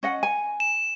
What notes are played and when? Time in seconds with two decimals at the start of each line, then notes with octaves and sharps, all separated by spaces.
0.03 C#4 D#5 F#5
0.23 G#5
0.60 E7